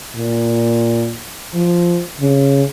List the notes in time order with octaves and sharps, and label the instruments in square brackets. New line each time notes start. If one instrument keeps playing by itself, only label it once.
[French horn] A#2
F3
C#3